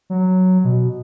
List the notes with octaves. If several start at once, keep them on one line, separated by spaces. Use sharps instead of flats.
F#3
B2